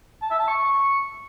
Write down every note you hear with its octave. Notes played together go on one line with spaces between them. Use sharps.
A5
E5
A5
C#6